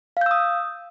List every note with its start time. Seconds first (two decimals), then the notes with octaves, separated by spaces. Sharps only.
0.17 F5
0.21 G6
0.26 E6
0.31 D#6